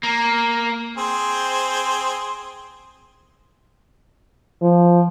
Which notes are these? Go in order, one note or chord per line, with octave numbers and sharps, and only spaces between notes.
A#3
C4 G#4 C5
F3